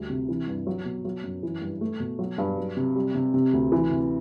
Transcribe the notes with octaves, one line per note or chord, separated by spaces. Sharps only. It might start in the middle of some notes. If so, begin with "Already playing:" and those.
Already playing: D2 G3
C3
E3
G2
F#3
B2
F#3
F#2
E3
G2
A3
B2
F#3
G2
F#3
C3
G3
C3
C3
D2
E3
C3